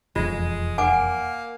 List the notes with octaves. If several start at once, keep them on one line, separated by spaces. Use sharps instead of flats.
E1 F2 G#3 F4
A#3 F#5 G#5 D6